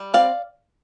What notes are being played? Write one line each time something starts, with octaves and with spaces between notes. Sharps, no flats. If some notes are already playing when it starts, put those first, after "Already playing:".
Already playing: G3
C4 D5 F5